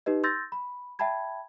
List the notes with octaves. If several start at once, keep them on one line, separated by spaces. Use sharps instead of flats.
D#4 G4 B4 D#5
C6 E6 G6 A6 A#6
B5
E5 G5 A5 B5 G#6